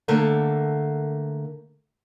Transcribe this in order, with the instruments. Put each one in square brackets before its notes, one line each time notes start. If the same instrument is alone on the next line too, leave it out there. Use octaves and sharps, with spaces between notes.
[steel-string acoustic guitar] D3 A3 A#3